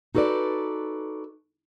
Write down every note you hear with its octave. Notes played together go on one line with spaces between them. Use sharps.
D#4 F#4 A4 B4 D5